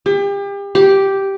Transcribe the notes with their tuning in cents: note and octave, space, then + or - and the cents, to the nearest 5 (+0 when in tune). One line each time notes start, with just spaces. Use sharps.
G4 +35
G4 -5